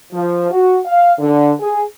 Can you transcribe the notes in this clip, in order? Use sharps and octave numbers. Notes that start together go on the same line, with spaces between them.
F3
F#4
F5
D3
G#4